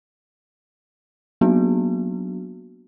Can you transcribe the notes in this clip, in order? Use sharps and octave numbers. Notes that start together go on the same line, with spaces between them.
F#3 A#3 B3 D4 F#4